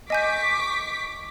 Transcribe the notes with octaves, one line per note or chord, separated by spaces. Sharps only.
D#5 G#5 C#6 D6 G6 B6